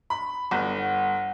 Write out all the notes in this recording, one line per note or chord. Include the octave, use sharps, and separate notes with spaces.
B5
G1 F#5